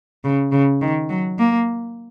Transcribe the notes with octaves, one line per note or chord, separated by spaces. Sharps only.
C#3
C#3
D#3
F#3
A#3